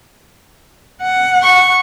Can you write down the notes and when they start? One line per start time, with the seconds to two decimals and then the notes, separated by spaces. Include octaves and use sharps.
1.03 F#5
1.43 C#6